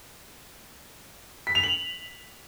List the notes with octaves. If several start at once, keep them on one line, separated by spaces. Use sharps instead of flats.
B6
F7
F#7